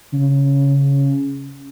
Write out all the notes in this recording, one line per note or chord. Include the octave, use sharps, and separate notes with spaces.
C#3